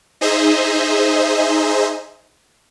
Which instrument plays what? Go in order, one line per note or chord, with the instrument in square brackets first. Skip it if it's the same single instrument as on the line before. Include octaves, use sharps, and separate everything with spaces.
[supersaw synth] D#4 G#4 C5 D#5 E5